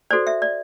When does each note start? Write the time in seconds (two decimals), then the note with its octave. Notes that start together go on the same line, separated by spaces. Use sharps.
0.11 F#4 A4 C5 D5
0.27 E5
0.42 D5